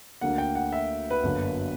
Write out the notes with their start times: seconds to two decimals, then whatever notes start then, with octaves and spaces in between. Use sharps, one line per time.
0.21 D2 D3 A#3 F#5
0.38 G5
0.55 F#5
0.73 E5
1.10 B4
1.23 G1 F#2 D3 A#3